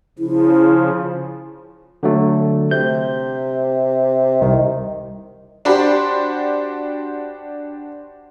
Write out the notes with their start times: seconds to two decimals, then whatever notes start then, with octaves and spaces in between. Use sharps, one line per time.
0.19 C#3 F3 E4
2.03 D3 F#3 A3
2.71 C3 G6
4.41 C2 D#3
5.65 D4 F#4 G4 C5 B5 C6